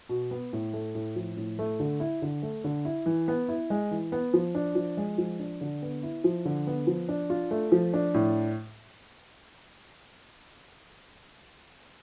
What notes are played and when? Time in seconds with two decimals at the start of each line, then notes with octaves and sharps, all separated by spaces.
0.09 B2
0.31 B3
0.53 A2
0.73 A3
0.95 A2
1.16 F3
1.37 A2
1.59 A3
1.80 D3
2.00 E4
2.22 D3
2.42 A3
2.64 D3
2.85 E4
3.06 E3
3.28 B3
3.49 E4
3.70 G#3
3.91 E3
4.12 B3
4.34 F3
4.55 D4
4.75 F3
4.97 G#3
5.18 F3
5.39 D4
5.61 D3
5.82 B3
6.03 E4
6.24 F3
6.45 D3
6.67 B3
6.87 F3
7.09 D4
7.30 F4
7.51 A3
7.72 F3
7.94 D4
8.14 A2